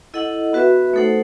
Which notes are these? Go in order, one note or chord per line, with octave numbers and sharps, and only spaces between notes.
E4 A4 D#5 F#5
B3 F#4 B4 E5
A3 D#4 A4 C5 F#5